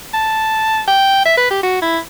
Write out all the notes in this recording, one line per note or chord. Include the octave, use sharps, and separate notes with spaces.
A5
G5
E5
B4
G4
F#4
E4